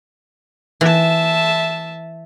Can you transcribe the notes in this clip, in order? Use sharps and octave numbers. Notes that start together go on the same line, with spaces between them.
E3 E5 A5